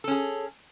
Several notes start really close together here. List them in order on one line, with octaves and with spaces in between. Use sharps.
A4 C#4 G#4